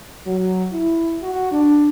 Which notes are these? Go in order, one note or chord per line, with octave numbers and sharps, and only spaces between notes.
F#3
E4
F#4
D4